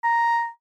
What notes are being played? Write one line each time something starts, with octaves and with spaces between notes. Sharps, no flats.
A#5